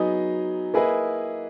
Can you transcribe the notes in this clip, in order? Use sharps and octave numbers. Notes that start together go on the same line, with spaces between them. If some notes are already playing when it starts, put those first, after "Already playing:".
Already playing: F#3 B3 D#4 G#4 D#5
A#3 E4 G#4 B4 D#5